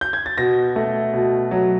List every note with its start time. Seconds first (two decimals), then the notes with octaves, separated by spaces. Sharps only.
0.01 G6
0.13 G#6
0.26 A6
0.38 B2 A#6
0.76 A3
1.13 B2
1.51 F#3